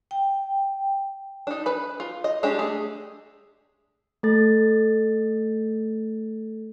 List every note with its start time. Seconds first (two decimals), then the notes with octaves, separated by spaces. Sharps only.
0.11 G5
1.47 D4 D#4
1.66 B4 B5
2.00 F4
2.24 D#5
2.43 G#3 C#4 D4 G4
2.59 A3 G#4
4.23 A3 A4 A6